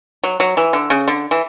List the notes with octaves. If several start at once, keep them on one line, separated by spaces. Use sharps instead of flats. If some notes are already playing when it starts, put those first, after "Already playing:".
F#3
F#3
E3
D3
C#3
D3
E3